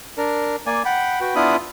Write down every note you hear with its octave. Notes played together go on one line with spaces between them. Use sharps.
D4 A#4
A#3 D5 G#5
F#5 G5 B5
F#4 B4 G5
B3 D4 E4 F4 B5 D#6